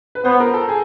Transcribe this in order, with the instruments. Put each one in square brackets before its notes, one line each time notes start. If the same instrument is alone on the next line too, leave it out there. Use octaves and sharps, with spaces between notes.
[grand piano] B4
[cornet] B3 [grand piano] C5
[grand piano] A#4
A4
G#4